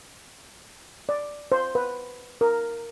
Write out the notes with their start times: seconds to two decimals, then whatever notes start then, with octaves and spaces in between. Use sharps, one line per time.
1.09 D5
1.52 C5
1.75 B4
2.41 A#4